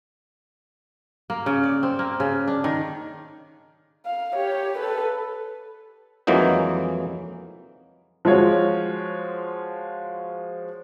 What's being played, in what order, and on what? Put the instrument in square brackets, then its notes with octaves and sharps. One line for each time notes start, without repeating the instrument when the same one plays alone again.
[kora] A#3
C#3
D5
C4
A#3
C#3
D4
D#3
[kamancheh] F5
G4 C#5
A4 B4
[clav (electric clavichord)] F2 E3 F#3 G#3 A#3 D#4
[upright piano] F3 G#3 F4 F#4 C#5